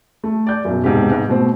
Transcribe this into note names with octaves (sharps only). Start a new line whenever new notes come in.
A3
D5 G6
B1 F#2
E1 G#2 C3 G4
G#2
B2 A3 C4